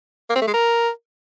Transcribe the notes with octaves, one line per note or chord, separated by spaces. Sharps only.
A#3
C4
A3
G#3
A#4